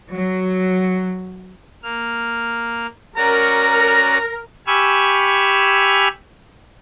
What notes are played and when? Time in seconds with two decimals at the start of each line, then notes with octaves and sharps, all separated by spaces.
0.15 F#3
1.83 A#3 F6
3.17 C#4 F#4 A#4 D5 A#5
4.67 G4 G#5 B5 C#6 E6 F6